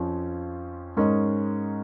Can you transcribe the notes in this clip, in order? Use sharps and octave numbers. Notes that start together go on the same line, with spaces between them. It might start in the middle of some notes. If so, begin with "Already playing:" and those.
Already playing: F2 F3 C#4 F4
G#2 G#3 C#4 A#4 D#5